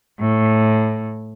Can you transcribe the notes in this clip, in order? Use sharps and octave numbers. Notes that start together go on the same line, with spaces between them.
A2